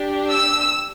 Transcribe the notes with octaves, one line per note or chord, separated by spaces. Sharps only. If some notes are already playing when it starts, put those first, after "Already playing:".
Already playing: D4 G4
E6